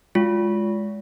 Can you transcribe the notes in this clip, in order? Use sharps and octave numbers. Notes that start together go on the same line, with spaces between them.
G#3 F4